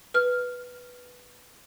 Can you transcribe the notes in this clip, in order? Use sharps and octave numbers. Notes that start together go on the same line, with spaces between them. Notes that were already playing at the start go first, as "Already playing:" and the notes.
B4 F6